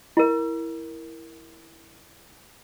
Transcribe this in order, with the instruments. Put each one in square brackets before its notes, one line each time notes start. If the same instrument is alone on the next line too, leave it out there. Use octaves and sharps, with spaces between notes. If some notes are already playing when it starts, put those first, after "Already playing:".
[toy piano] E4 A#4